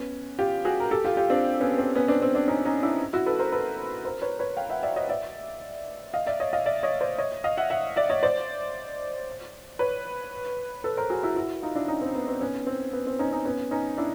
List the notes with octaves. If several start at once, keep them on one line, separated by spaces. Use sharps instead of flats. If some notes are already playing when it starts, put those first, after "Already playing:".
Already playing: B3 C#4
F4 G4
F#4 G#4
A#4
G4 A4
F4 G4
F4 G4
C4 D4
B3 C#4
C4
B3 C#4
C4 D4
C4
C4 D4
C#4 D#4
C#4 D#4
D4 E4
E4 F#4
A4 B4
A#4 C5
A4 B4
A#4 C5
B4 C#5
B4 C#5
F5 G5
E5 F#5
D5 E5
C#5 D#5
D5 E5
D#5 F5
D5 E5
C#5 D#5
D#5 F5
D5 E5
C#5 D#5
C5 D5
C#5 D#5
D#5 F5
E5 F#5
E5 F#5
D5 E5
C#5 D#5
C5 D5
B4 C#5
A4 B4
A#4 C5
F#4 G#4
E4 F#4
E4 F#4
D#4 F4
D4 E4
C#4 D#4
C4
B3
C4
B3 C#4
C4
B3
C4
C#4 D#4
C#4 D#4
B3 C#4
C#4 D#4
D4 E4